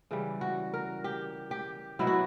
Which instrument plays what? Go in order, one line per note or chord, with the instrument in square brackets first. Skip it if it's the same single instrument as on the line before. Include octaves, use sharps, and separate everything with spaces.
[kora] C#3 E3 G3
F#4
A#4
G4
G4
B2 F#3 E4
F#4